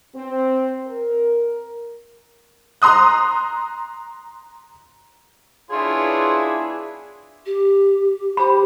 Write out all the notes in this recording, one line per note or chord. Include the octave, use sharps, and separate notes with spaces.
C4
A#4
A#5 C6 D#6 F#6
B3 D4 E4 F4 G#4 C#5 C6
G4
G4 C5 B5